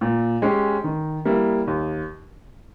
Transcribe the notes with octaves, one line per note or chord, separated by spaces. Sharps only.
A#2
G#3 C#4 G4
D#3
G3 A#3 E4
D#2